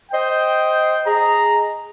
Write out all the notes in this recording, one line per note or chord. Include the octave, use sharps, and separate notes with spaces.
C5 D#5 G5
G#4 D#5 A#5